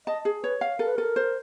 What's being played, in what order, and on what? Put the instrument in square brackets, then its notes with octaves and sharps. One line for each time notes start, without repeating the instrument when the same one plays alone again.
[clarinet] D#5 [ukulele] A5
[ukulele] G#4
[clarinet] B4 [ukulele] C#5
[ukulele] F5
[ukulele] A4 [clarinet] A#4
[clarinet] B4
[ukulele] A4 [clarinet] A#4
[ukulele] C5